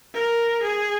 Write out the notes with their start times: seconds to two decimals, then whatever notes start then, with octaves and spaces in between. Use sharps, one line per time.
0.14 A#4
0.62 G#4